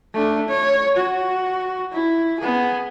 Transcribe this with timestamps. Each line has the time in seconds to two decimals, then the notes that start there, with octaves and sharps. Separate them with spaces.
0.14 A3 D4
0.49 C#5
0.97 F#4
1.93 E4
2.40 B3 G#4